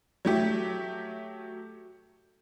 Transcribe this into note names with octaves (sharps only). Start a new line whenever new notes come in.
F#3 A3 G4